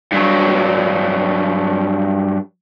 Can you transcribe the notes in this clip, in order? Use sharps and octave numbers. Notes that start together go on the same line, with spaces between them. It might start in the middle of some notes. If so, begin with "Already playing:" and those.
G2 F#3